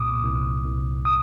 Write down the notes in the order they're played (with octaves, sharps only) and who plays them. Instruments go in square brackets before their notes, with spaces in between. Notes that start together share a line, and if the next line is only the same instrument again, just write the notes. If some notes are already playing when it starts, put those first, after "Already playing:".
Already playing: [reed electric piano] C2 A#2 D6 D#6
C2
C2
D#6